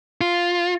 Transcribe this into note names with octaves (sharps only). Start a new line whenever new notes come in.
F4